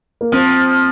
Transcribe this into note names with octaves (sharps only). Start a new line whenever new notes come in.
A#3
F3 C4